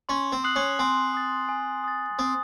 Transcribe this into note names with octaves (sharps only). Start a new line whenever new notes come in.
C#4 C6
C4
D#6 F#6 C7 F#7
C#4
C4 G#5
D#6 A6
G#5
D#6 A6
C4 D#6